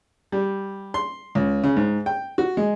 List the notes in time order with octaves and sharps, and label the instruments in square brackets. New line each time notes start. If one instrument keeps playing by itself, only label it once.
[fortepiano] G3
C6
C#2
C#3
G#2
G5
F#4
G#3